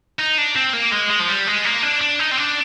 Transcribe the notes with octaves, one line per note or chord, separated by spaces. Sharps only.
D#4
D4
C4
A#3
G#3
G#3
F3
G3
G#3
A#3
D4
D4
D#4
C4
D4